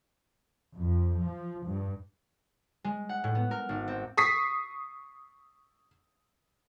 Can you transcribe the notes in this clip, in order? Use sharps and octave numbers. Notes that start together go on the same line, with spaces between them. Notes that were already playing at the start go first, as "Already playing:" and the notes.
F2
F3
G2
G#3
F#5
A2
B3
A#4
G#1
C4
C#6 D#6 B6 C7